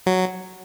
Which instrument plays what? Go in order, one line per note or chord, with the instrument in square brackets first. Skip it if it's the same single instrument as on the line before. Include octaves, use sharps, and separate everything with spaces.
[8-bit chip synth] F#3